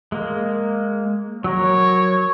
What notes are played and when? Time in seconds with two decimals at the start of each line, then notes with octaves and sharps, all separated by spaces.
0.12 G#3 A#3
1.44 F#3 A#4 C#5